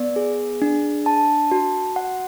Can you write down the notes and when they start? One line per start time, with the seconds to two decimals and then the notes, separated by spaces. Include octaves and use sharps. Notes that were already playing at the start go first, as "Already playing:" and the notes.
Already playing: B3 D5
0.16 G#4
0.62 D4
1.06 A5
1.51 F#4
1.96 F#5